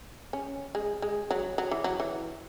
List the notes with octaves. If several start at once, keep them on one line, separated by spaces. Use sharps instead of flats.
C#4
G#3
G#3
F#3
F#3
E3
F#3
E3